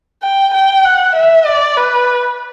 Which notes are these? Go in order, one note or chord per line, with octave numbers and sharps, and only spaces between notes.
G5
G5
F#5
E5
D5
B4